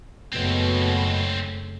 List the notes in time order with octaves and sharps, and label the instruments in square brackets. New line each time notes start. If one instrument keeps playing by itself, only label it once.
[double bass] F#1 A3 [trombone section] B2 [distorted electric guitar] C4 C#4